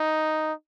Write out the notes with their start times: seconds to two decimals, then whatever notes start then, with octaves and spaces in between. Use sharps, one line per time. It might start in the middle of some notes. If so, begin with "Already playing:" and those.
Already playing: D#4